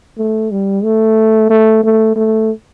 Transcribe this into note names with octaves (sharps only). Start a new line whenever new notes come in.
A3
G3
A3
A3
A3
A3